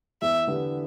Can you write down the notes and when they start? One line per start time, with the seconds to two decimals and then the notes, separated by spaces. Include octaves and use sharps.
0.22 E2 E5
0.47 D3 B3 E4 G4